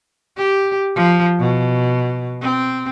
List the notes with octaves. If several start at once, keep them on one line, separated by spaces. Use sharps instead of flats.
G4
F3
B2
C4